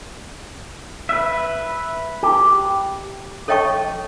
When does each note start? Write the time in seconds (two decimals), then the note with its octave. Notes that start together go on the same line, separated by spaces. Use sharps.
1.09 B4 E5
2.23 G4
3.48 A4 C#5 D#5 G5 A5 C#6